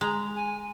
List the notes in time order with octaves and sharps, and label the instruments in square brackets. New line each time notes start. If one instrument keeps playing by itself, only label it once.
[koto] G#3 [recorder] A#5
[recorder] G#5